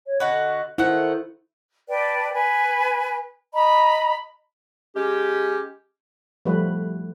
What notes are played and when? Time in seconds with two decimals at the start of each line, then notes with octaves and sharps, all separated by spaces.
0.06 C#5
0.20 D3 F#4 B4 D#5
0.78 D#3 A3 E4 C5 F#5
1.89 B4 D5 G5 A5
2.32 B4 G#5
3.54 D#5 A#5 B5
4.96 G#3 C#4 G4
6.45 F3 G3 A3 B4